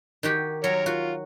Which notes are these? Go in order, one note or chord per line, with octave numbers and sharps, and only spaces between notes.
D#3 F#4 G4
F#3 A#4 C#5
F4 F#4